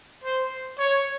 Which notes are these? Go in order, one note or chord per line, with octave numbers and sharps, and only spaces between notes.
C5
C#5